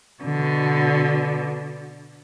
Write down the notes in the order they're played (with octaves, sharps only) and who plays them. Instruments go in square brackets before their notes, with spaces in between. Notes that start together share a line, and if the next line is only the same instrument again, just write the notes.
[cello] B2 D3